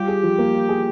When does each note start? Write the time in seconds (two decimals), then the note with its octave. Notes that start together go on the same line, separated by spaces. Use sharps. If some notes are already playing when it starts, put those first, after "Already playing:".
Already playing: G3 F4 G4
0.08 G#4
0.23 F3
0.38 A#3
0.54 F4
0.69 G#4